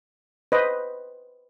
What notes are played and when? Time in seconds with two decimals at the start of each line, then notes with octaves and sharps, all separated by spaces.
0.52 B4 C5 D#5